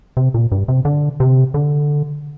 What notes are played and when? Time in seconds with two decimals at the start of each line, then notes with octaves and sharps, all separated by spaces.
0.17 C3
0.34 A#2
0.52 G2
0.68 C3
0.85 D3
1.20 C3
1.54 D3